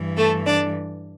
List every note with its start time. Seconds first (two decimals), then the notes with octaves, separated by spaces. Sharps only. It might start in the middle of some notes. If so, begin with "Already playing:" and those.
Already playing: G2 E3
0.16 A3 A4
0.46 D4 D5